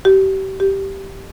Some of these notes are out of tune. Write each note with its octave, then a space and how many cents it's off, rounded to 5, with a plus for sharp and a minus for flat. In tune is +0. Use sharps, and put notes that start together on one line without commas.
G4 -30
G4 -10